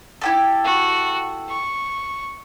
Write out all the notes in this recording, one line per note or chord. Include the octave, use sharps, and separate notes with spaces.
E4 G4 A4
F#4
C#6